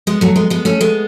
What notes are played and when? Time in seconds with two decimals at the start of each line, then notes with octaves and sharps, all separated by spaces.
0.07 G#3 B3
0.21 F#3 A3
0.36 G#3 B3
0.50 G#3 B3
0.65 A3 C#4
0.81 G#3 B3